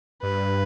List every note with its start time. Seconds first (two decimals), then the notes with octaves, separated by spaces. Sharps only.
0.23 G2 B4